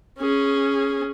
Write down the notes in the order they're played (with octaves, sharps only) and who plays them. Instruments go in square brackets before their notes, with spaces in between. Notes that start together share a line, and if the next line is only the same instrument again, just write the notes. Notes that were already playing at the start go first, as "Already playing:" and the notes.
[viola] C#4 G#4